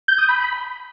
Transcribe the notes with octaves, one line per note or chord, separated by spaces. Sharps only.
G6
D#6
B5